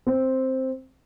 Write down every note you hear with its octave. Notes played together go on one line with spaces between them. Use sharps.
C4